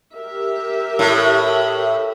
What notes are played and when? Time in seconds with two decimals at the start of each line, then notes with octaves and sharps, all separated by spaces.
0.15 G4 A#4 E5
0.99 A2